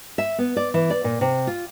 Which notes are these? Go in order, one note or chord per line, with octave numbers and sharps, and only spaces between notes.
E5
B3
D5
E3
D5
A#2
C3
F4